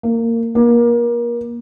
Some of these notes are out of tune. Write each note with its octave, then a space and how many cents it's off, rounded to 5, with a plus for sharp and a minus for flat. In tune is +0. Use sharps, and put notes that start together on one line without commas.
A#3 -20
A#3 +30